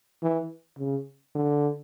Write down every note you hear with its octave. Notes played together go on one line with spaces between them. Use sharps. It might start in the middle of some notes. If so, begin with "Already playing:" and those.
E3
C#3
D3